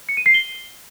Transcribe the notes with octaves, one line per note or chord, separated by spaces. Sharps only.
C#7
D#7
C7
G7